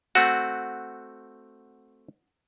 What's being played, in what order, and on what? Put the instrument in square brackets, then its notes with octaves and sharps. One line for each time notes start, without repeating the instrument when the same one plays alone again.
[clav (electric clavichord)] A3 C4 F#4 [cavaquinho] F#5